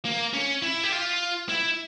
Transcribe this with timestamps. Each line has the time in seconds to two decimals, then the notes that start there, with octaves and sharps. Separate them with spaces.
0.05 A#3
0.33 C#4
0.62 E4
0.83 G4
0.92 F4
1.49 E4